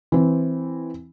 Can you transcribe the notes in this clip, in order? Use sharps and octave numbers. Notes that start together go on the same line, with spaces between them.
E3 C4